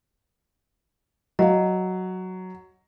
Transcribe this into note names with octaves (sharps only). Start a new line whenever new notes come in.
F#3 D#5 F5